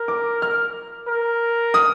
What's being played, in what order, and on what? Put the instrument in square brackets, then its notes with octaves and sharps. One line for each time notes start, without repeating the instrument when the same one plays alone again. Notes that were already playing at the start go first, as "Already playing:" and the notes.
Already playing: [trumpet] A#4
[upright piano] D6
F6
[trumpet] A#4
[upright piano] D#6